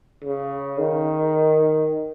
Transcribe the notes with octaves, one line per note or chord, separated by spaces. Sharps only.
C#3
D#3